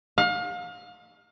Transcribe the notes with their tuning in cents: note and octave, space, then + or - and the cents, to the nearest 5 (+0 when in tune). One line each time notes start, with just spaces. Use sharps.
F5 +35